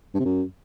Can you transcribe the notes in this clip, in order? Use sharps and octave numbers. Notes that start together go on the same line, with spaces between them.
G2
C3
F#2